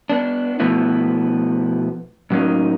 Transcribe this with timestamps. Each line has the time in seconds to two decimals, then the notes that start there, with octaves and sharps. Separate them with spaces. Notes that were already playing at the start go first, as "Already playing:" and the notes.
0.09 B3 D4
0.60 B2 F3 A3 B3 E4
2.30 A2 F#3 A#3 C#4 D#4